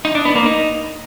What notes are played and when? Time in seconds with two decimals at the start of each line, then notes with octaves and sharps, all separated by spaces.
0.05 D#4
0.15 D4
0.25 B3
0.35 A#3
0.46 D#4